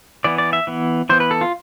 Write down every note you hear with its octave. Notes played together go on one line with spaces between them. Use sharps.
E3 B3 D5
D5
E5
E3 B3
E3 B3 C5
B4
A4
F4